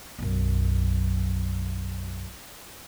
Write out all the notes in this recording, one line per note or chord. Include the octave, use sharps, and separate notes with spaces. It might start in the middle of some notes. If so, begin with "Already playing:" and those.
B1 F#2